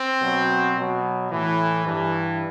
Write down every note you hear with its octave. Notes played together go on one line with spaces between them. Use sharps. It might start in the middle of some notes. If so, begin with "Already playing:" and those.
Already playing: C4
B2 F#3
B2 F#3
A2 E3
G2 E3